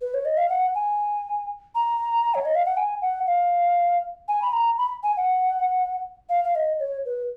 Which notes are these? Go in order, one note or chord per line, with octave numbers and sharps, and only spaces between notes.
B4
C#5
D#5
F5
F#5
G#5
A#5
C#5
D#5
F5
F#5
G#5
F#5
F5
G#5
B5
A#5
B5
G#5
F#5
F5
F5
D#5
C#5
B4